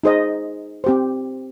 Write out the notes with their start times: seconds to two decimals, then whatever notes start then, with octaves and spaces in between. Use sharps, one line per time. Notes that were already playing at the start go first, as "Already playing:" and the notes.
0.03 D#4 G#4 C5 D#5
0.84 C4 G4 C5